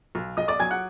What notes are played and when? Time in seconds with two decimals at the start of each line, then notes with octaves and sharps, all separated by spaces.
0.15 B1
0.37 B1 D#5 D#6
0.48 D5 D6
0.59 F#3 G#5 G#6
0.71 F#5 F#6